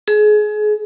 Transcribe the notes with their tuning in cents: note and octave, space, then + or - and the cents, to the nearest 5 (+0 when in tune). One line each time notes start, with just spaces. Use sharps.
G#4 +30